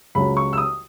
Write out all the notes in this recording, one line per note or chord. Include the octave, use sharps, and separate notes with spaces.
C#2 C#3 F#3 B5
C#6
E6
D#6